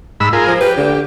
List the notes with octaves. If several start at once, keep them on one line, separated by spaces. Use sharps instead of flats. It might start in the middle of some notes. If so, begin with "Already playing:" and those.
G#2 B5 E6
F4 G#4 A#4
F3
G4 B4
D3